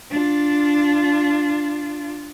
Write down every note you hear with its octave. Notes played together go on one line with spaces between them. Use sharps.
D4 F4